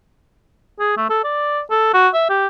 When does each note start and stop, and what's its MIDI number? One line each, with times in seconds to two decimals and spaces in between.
0.80 0.96 68
0.97 1.07 57
1.10 1.20 69
1.24 1.61 74
1.70 1.93 69
1.93 2.08 66
2.14 2.29 76
2.29 2.47 67